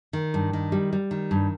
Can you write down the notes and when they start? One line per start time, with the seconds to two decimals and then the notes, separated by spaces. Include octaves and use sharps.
0.13 D#3
0.34 G2
0.53 D#3
0.72 G3
0.93 G3
1.11 D#3
1.31 G2